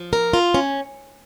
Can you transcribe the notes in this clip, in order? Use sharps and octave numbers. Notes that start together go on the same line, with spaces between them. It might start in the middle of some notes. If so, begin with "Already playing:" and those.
Already playing: F3
A#4
F4
C#4